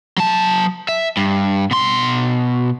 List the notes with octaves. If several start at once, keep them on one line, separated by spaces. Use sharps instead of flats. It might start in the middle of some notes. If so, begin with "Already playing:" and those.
F#3 A5
E5
G2
B2 C6